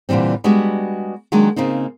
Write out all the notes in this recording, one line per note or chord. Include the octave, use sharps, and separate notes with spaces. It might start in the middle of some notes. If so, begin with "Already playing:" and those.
A#2 D3 E3 G3 C4
G3 G#3 B3 D4 F#4 G4
D#3 F#3 G#3 A#3 D4 D#4
C#3 A#3 C4 D#4